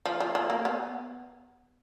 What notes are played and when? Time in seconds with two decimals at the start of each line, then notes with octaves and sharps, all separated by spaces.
0.05 F3
0.20 F3
0.35 F3
0.50 A#3
0.65 B3